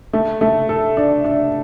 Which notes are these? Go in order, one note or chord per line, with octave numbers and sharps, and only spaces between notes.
A3
A3
A4
D4
D4